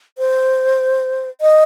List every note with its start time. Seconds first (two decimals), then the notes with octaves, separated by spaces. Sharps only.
0.18 C5
1.41 D#5